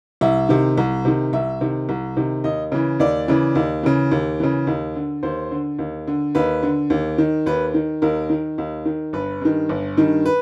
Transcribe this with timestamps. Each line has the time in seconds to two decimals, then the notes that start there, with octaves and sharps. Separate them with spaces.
0.21 C2 E5
0.49 C3 D#3
0.78 C2
1.05 C3 D#3
1.33 C2 E5
1.61 C3 D#3
1.89 C2
2.17 C3 D#3
2.44 D#2 D#5
2.72 C#3 E3
3.00 D#2 D5
3.28 C#3 E3
3.55 D#2
3.83 C#3 E3
4.12 D#2
4.40 C#3 E3
4.67 D#2
4.96 D3
5.23 D#2 C5
5.51 D3
5.79 D#2
6.07 D3
6.35 D#2 B4
6.63 D3
6.90 D#2
7.18 D#3
7.46 D#2 B4
7.74 D#3
8.02 D#2 A#4
8.30 D#3
8.58 D#2
8.85 D#3
9.13 G1 B4
9.42 G2 D#3
9.69 G1
9.97 G2 D#3
10.26 B4